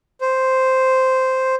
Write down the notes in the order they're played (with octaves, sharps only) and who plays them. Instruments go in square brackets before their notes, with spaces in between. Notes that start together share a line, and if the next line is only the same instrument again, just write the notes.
[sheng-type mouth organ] C5